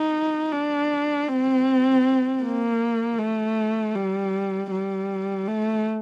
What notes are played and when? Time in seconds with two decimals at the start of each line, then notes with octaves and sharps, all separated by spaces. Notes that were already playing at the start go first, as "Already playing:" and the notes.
Already playing: D#4
0.52 D4
1.28 C4
2.42 A#3
3.18 A3
3.95 G3
4.71 G3
5.47 A3